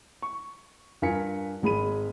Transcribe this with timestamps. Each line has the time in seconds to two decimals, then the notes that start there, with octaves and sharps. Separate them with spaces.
0.22 C#6
1.02 G2 F4 A#4 G#5 B6 C#7
1.62 G#1 G#3 B5 D#7